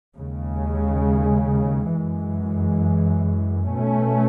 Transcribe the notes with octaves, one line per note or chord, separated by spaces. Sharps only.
D#2 C#3 G#3
F#2 E3 G#3
B2 A3 C#4